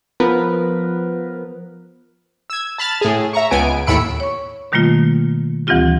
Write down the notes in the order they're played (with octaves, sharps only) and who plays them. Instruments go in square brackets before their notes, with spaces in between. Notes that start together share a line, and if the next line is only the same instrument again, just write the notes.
[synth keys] F3 B3 A#4 B4
[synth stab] E6 G#6
A5 B5 F6 A6
A2 G#4
E5 A#5 C#6
C#2 B3 G#5 D7
D#2 A2 B5 E6 C#7 D7
[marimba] C#5 C#6
B2 D#3 G3 A3 A#3 F4
D2 E3 G3 C4 F4 G4